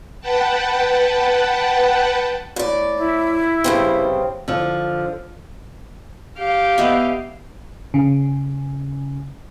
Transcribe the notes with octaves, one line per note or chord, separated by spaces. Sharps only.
B4 F#5 G5 A5
A2 D5
E4
G2 C#3 C4
D3 F3
G4 F5 G5
B3 D#5 E5
C#3